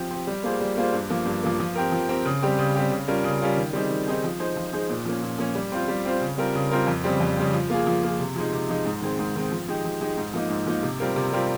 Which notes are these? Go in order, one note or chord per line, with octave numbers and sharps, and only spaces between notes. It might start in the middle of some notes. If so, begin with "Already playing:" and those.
Already playing: F3 C4 G4
C4 G4
G3
A#3 F4 G#4 C5
G3
A#3 F4 G#4 C5
G2
F3 A#3
G2
F3 A#3
F3
C4 G4 A#4
F3
C4 G4 A#4
C#3
G3 C4 G4
C#3
G3 C4 G4
C#3
G3 C#4 F4 A#4
C#3
G3 C#4 F4 A#4
D#3
G3 C4 D#4 G#4
D#3
G3 C4 D#4 G#4
F3
G#3 D#4 G#4 C5
F3
G#3 D#4 G#4 C5
A#2
F3 A#3 C#4
A#2
F3 A#3 C#4
G3
C4 F4 C5
G3
C4 F4 C5
C#3
G3 C4 F4 A#4
C#3
G3 C4 F4 A#4
F2
C#3 G3 C4
F2
C#3 G3 C4
F3
A#3 F4 G#4
F3
A#3 F4 G#4
C3
F3 G#3 D#4
C3
F3 G#3 D#4
G#2
D#3 G#3 C4
G#2
D#3 G#3 C4
F3
G#3 D#4 G4
F3
G#3 D#4 G4
G#2
F3 A#3 D#4
G#2
F3 A#3 D#4
C3
G3 C4 F4 A#4
C3
G3 C4 F4 A#4